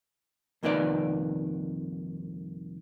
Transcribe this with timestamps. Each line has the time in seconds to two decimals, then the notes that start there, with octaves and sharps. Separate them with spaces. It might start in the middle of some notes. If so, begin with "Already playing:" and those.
0.63 C2 F2 A#2 D#3 B4 D5